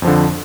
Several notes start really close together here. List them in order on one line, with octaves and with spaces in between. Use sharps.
F2 F3 D3